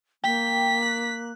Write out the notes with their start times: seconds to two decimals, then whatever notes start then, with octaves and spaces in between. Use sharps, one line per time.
0.24 A#3 G5 B6
0.83 F#6